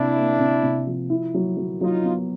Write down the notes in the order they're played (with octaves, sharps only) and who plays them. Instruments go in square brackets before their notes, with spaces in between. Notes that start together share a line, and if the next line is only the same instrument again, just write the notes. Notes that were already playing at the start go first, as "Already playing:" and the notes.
Already playing: [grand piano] C3 A#3 [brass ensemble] D4 E4
[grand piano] A#3
C3
C3
F3
E4
F#3
F#3
[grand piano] F#3 [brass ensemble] D#4 F4
[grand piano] B3